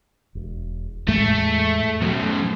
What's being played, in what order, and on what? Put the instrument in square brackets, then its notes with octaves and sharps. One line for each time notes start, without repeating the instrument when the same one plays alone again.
[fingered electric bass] E1
[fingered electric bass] E2 A2 G#3 [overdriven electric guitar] A3
[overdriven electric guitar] F#2 B2 [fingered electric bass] F3